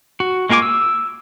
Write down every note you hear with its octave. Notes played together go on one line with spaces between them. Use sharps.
F#4
G#3 A#3 F4 G#5 D6
E6